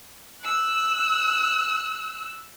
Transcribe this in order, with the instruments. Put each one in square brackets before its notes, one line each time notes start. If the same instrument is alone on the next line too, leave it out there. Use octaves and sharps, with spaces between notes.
[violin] E6 F#6